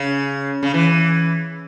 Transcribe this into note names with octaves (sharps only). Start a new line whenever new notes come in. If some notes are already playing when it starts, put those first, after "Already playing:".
Already playing: C#3
C#3
E3